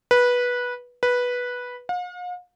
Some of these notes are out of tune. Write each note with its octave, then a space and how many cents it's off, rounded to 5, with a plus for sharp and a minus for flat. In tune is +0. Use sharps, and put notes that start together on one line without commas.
B4 -15
B4 -10
F5 +45